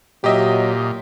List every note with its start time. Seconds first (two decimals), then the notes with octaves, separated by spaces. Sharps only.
0.24 A#2 F#3 G4 D#5 E5